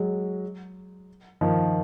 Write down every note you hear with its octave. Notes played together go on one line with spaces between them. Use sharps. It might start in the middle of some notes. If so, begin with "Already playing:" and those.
Already playing: F#3 G#3
D#3 F3